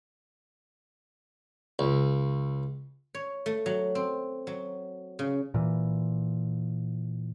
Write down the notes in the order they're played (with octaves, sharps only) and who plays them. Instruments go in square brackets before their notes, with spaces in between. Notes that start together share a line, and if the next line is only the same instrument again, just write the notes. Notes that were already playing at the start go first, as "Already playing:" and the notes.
[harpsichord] C#2
[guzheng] C#5
A3
F#3
C4
F#3
C#3
[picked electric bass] A#2 E3